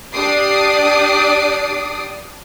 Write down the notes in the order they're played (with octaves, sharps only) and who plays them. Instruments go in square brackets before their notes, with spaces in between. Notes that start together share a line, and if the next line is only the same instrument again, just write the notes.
[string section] D4 G4 D5 D6 D#6 C7